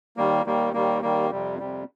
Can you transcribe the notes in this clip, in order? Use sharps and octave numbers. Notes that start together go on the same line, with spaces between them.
D#2 D#3 G3 A#3
D#2 D#3 G3 A#3
D#2 D#3 G3 A#3
D#2 D#3 G3 A#3
F2 C3 G3
F2 C3 G3